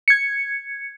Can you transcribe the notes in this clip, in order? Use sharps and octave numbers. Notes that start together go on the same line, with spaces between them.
G#6 C#7